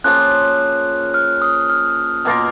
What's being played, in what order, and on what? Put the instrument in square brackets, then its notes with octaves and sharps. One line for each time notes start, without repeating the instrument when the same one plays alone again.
[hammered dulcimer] C#3 F3 A#3 F4 [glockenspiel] F#6
[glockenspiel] F6
D#6
F6
[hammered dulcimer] B2 A#3 F4 A#4